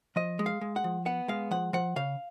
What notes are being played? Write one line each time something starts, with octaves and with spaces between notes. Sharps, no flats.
F3 D#5
G#3
F5
G#3
F#5
F3
B3 F#5
G#3 F5
F3 F#5
F3 F#5
C#3 F5